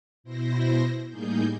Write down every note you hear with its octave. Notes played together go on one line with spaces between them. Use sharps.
B2 E4 C5 A#6
A2 G3 A#3 D#4 G#4 G6